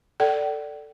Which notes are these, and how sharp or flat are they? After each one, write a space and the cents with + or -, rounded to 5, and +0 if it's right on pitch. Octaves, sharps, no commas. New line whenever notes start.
A4 +10 D5 +0 G5 -45